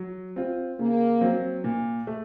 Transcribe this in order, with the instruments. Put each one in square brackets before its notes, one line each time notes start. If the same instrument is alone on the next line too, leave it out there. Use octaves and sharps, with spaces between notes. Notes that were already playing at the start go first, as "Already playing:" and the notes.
Already playing: [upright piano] F#3
C4 F4
[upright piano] C#3 [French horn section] A#3
[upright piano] F#3 C4
A#2
A3